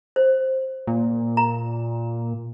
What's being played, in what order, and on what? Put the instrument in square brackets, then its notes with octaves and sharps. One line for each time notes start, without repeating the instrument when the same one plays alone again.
[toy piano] C5
[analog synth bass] A#2
[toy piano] A#5